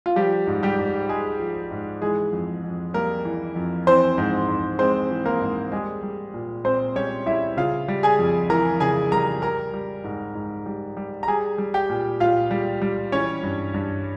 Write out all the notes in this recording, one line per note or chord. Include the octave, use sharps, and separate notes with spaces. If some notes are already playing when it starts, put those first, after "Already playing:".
F4
F3 G3 G4
G#2
G3 G4
G#2
G#3 G#4
F3
G#2
E3 G#3 G#4
F2
F2
G3 A#3 A#4
E3
F2
E3 C4 C5
G#2
G#2
G#3 C4 C5
E3
A#3 A#4
G#2
G3 G#3 G#4
G3
A#2
A#2 C4 C5
G3 C#4 C#5
G3 E4 E5
C#3 F4 F5
G3
G#4 G#5
F2
E3 A#4 A#5
C#3 G#4 G#5
G3 A#4 A#5
G3 A#4 A#5
G3
G#2
G#2
G3
G3
A#5
G3 G#4 G#5
G3
G4 G5
A#2
A#2 F4 F5
G3
G3
E3 C#4 C#5
G2
G2